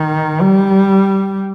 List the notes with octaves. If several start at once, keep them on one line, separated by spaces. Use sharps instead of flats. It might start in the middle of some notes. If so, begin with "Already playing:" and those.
Already playing: D#3
G3